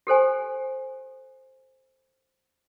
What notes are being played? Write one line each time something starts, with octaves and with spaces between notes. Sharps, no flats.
G4 A4 C5 G#5